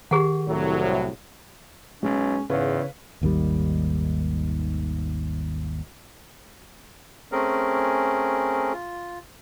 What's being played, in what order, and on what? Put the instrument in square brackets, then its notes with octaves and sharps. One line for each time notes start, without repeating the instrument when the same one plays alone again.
[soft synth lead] D#3 [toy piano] G4 G#4 F#5
[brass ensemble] C2 A2 F#3
[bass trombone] B1 [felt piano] G#3 [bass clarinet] C#4
[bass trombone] E2 [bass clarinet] G#2 [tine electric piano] C#3 C#5 [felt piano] B4 F5
[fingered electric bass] G#1 D#2 D#3 G3
[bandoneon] A3 C4 C#4 G#4 A#4
F4